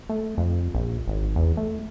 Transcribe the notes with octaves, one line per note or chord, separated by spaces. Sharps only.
A3
F2
A#1
G#1
E2
A3